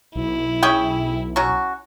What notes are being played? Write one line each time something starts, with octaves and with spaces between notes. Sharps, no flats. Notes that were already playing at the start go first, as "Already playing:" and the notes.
B1 E4
C#4 G#4 G5
F#3 C#4 F#4